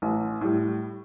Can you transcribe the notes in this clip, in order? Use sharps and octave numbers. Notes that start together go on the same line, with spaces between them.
A1
A2 G3